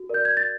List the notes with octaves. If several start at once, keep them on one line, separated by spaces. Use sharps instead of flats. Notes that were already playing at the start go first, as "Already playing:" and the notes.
Already playing: F#4
A#4 D5 G6
G#6
A6